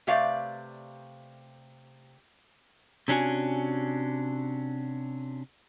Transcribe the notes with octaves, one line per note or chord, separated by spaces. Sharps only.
C3 A3 G4 B4 D5 F5
C3 C#4 D4 F#4 G#5